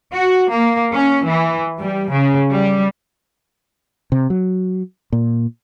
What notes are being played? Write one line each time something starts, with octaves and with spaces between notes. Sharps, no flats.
F#4
A#3
C#4
E3
G3
C#3
G3
C3
F#3
A#2